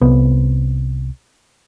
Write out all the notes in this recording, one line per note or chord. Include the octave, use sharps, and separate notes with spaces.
C2 B3